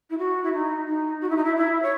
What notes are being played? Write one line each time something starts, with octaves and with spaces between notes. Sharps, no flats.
E4
F#4
E4
D#4
D#4
F#4
E4
D#4
E4
E4
C#5